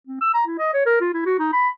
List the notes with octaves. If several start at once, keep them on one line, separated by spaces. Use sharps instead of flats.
C4
E6
A#5
E4
D#5
C#5
A#4
F4
E4
F#4
D#4
B5